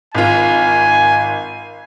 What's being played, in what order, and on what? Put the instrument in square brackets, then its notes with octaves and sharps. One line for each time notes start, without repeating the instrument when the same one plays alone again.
[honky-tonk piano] G#1 F4 [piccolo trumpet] G#5